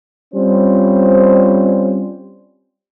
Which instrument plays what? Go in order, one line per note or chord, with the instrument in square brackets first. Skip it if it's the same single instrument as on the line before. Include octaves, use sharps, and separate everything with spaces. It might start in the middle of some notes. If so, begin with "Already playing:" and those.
[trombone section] G3 C4 C#4 F4 C5